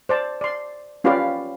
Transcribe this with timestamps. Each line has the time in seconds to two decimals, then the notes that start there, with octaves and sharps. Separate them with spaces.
0.09 C5 D5 A5
0.41 D5 C6
1.04 C#4 F4 G4 B4 D5 F5